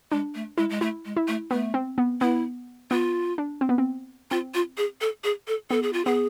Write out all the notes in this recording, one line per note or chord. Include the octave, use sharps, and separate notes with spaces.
G#3 D4
A3
G#3 E4
G#3
A3 E4
G#3
E4
A3
A3 B3
C4
B3
B3 E4
B3 F4
D4
C4
B3
C4
C4 F4
F4
G#4
A4
G#4
A4
B3 A4
G#4
F4
B3 G#4